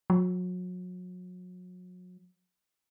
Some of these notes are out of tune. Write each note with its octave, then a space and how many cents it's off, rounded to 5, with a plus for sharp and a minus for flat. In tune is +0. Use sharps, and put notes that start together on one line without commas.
F#3 -35